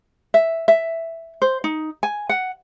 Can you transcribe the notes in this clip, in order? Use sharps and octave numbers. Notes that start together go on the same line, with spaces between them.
E5
E5
C5
D#4
G#5
F#5